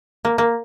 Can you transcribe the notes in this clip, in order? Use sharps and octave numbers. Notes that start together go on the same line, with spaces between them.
A#3
A#3